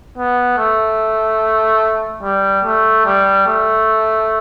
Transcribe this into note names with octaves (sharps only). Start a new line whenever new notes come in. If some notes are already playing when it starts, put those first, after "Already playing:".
B3
A3
G3
A3
G3
A3